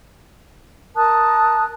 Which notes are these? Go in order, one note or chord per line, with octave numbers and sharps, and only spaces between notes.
A#4 A5 D#6 F#6